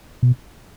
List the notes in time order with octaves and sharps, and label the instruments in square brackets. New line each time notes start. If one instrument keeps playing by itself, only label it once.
[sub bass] B2